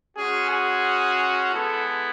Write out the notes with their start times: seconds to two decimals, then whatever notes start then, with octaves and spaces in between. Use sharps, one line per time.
0.16 G#3 C#4 F#4 G#4
0.50 G#4
1.53 G#3 B3 E4 A4